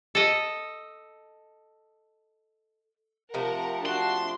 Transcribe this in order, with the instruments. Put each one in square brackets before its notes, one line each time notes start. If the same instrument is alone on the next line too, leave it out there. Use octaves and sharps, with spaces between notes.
[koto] A4 D#5
[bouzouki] C3 F3 A3 [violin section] A#4 F#5
[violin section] D4 [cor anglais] F#4 [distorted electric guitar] C6